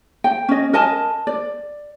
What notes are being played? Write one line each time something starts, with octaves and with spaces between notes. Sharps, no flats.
G5
C#4 D#5
A#4 D#5 G#5 A5
D5